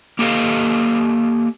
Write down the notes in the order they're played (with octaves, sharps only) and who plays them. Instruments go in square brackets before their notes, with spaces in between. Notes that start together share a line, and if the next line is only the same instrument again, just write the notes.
[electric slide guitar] A#3 G4 A4 D#5 F5